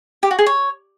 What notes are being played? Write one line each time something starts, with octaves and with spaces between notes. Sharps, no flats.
G4
F#4
G#4
C#5